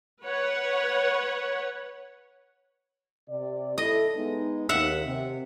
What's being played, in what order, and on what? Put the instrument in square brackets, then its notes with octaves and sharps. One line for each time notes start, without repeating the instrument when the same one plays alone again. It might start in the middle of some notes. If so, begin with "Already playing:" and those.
[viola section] B4 C#5 F#5
[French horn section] C3 D5
[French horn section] E4 A4 [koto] D#5
[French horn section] G#3 B3 D#4
[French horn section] D#2 [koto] E5 F#5
[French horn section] C3